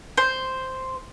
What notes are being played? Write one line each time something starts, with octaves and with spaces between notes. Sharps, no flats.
C5